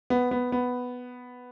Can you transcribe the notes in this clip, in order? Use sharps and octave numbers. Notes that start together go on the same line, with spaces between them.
B3
B3
B3